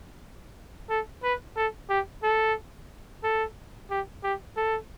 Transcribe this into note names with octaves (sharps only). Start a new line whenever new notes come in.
A4
B4
A4
G4
A4
A4
G4
G4
A4